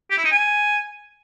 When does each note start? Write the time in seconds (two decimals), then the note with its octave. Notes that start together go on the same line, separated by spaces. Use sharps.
0.11 G4
0.18 E4
0.25 D#4
0.32 G#5